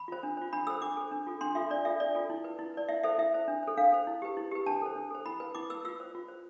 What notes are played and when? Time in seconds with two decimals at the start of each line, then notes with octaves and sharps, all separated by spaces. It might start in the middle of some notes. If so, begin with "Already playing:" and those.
Already playing: B5
0.08 F4 C5
0.23 D4
0.37 F4 C5
0.53 D4 B5
0.67 A4 C5 E6
0.82 D4 D6
0.97 A4 C5
1.12 D4
1.27 F4 A4
1.41 D4 C6
1.55 F4 A4 E5
1.70 D4 D5
1.85 F4 A4 E5
2.00 D4 D5
2.15 F4 A4
2.30 E4
2.44 B4
2.59 E4
2.74 B4 D5
2.89 E4 E5
3.04 A4 C5 E5
3.18 E4 E5
3.34 A4 C5
3.48 D4
3.63 A4 C5
3.77 D4 F5
3.92 A4 C5
4.07 E4
4.22 G4 B4
4.37 E4
4.51 G4 B4
4.66 D4 A5
4.82 A4 C5
4.96 D4
5.11 A4 C5
5.26 E4 B5
5.40 B4
5.55 E4 D6
5.70 B4 E6
5.85 F4 E6
6.00 C5
6.15 F4
6.29 C5